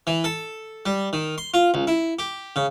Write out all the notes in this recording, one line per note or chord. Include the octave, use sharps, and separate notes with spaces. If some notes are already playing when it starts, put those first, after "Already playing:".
E3
A4
G3
D#3
C6
F4
C#2
E4
G4
C#3